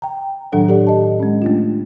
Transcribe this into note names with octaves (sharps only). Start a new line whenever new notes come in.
G5 A#5
A2 D#3 F#3 D4 A4 F#5
G4 A4 D5
D#5 A5
G#3 C#4
A3 D4 F4